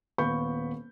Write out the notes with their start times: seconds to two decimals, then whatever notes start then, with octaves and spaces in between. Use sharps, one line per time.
0.18 D#1 B3 F5 B5 C#6 G6